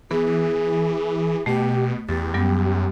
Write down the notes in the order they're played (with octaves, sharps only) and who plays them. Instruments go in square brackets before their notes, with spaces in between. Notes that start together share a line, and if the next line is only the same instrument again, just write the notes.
[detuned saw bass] E3 [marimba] B3 [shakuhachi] G#4
[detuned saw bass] B2 [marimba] A3 [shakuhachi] G4
[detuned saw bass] E2 [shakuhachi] G4 [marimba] A6
[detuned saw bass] F#2 [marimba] F#3 G3 B3